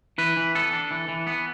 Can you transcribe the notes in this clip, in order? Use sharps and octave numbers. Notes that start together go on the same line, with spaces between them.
E3 B4
E3
B3 A4
D4
E3
E3
B3